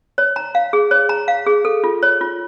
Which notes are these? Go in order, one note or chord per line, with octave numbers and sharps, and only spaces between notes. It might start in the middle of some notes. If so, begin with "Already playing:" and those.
C#5
A#5
F5
G#4
C#5
A#5
F5
G#4
A4
F4
C#5
F4